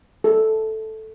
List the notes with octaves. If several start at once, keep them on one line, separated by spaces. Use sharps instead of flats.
A4